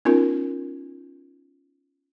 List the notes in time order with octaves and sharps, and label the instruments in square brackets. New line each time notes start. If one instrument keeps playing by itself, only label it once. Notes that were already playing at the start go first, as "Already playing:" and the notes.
[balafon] B3 C#4 D#4 F4 A#4